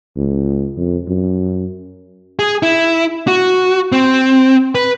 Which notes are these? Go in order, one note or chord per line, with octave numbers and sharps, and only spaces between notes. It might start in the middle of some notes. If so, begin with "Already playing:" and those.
C#2
F2
F#2
G#4
E4
F#4
C4
B4